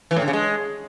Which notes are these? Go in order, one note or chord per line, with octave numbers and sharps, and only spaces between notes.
E3
A2
D3
C#3
G#3